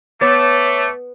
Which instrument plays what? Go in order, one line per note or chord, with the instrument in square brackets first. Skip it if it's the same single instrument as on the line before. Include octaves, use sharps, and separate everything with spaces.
[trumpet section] A3 [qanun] B3 [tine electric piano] C#5 A6 [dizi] D6